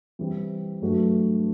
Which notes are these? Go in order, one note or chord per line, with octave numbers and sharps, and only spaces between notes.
E3 G3 C4
G2 F#3 A3 D4 F#4